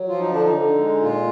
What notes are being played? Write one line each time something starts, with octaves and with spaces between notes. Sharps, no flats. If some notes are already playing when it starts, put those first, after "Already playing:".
Already playing: F#3
F3 F4
D#4
D3 D4
D#4
D3
G#3
A#2 F4